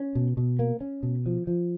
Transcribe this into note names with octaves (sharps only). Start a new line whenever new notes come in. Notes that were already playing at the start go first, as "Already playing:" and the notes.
Already playing: C#4
B2
B2
A#3
C#4
B2
F3
F3